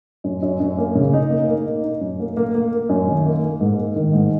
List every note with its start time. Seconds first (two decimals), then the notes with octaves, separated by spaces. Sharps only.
0.24 F#2
0.43 F#2
0.60 F#2
0.78 A#3
0.95 C#3
1.13 D#4
1.30 A#3
1.48 A#3
1.65 D#4
1.84 D#4
2.01 F#2
2.20 A#3
2.37 A#3
2.54 A#3
2.72 A#3
2.89 F#2
3.07 D#3
3.26 A#3
3.42 A#3
3.60 G#2
3.78 A#3
3.96 D#3
4.13 G#2